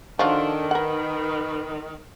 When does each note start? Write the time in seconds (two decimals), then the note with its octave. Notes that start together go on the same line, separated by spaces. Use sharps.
0.19 D#3 F3 D4 F4 F#4 A4
0.71 A#4 B4 F#5